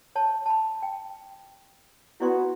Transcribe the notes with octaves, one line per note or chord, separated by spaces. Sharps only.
C#5 A5
A5 B5
G5
B3 E4 F#4 D5 C6